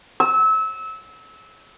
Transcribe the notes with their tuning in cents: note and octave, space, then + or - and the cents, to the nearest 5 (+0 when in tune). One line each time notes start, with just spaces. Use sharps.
E6 -25